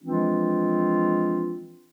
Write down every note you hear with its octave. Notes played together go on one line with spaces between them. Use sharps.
E3 F3 G#3 C4 D4 F4